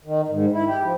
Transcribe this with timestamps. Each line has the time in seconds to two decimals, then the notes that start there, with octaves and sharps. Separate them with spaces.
0.05 D#3
0.28 G#2
0.52 E4
0.67 G4
0.82 F3